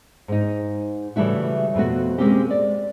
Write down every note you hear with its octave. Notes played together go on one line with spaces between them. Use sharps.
G#2 D#4
C#3 E3 G3 A3 E4 F#4
F2 B2 A3 F#4
G#3 A#3 C4 C#4 G4
D5